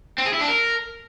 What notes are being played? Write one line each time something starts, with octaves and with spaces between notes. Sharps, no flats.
C4
G#4
E4
D4
A#4